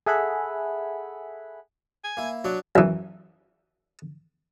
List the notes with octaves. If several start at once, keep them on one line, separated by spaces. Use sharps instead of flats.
G#4 A4 E5 F#5 G#5 B5
G#5
A#3 E4
F#3 D4 F#4 D5
F#2 E3